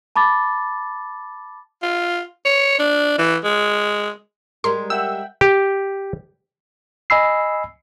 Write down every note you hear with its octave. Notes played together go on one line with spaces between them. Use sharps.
A5 B5 D6 A6
F4
C#5
D4
E3
G#3
G3 G#3 A#4 C6
E5 F#5 G5 E6
G4
D#5 G#5 B5 E6 C7